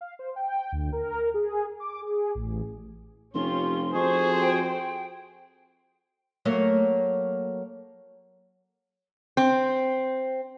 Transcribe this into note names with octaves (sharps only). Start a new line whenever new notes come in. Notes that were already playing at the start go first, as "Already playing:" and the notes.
F5
C5
G5
D2
A#4
G#4
D6
G#4
A1
F1 C#4 F4 G4 C6
F2 F#4 G#4 A4 C5 C#6
G5
F#3 A3 A#3
C4